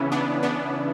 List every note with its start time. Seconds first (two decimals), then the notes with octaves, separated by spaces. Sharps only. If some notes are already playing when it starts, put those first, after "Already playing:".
Already playing: C#3 E3 B3 C#4 E4
0.12 B3 D4
0.43 B3 D4